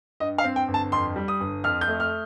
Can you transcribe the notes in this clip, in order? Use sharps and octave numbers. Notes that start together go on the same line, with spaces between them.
G2 D#5
F5
C4
G5
G1
A5
F2 C6
G3
D#6
G1
F2 F6
G6
A3
F6